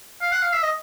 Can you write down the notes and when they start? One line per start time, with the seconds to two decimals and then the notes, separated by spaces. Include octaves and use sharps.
0.22 F5
0.32 F#5
0.42 F5
0.53 E5
0.63 D#5